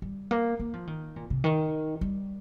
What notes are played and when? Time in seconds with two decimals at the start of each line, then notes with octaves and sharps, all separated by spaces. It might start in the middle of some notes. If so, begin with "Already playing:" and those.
0.02 G3
0.31 A#3
0.59 A#3
0.74 F3
0.87 D#3
1.16 A#2
1.30 C3
1.44 D#3
2.01 G3